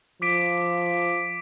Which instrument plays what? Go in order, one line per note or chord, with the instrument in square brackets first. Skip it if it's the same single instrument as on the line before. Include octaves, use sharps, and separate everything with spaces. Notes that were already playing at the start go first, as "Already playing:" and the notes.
[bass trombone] F3 [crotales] D6 B6 D7